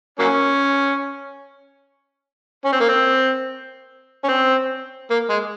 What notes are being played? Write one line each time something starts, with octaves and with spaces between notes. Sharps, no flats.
F#3 A#3 C#4
C#4
C4
A#3
C4
C#4
C4
A#3
G#3